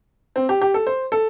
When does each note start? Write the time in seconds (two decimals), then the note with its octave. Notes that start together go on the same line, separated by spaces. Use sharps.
0.36 C4
0.49 G4
0.61 G4
0.74 A4
0.87 C5
1.12 A4